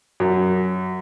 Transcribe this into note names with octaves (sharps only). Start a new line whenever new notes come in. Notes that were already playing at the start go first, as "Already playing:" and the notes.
F#2